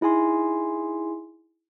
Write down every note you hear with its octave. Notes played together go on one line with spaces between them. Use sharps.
D#4 E4 G#4 G#5 C6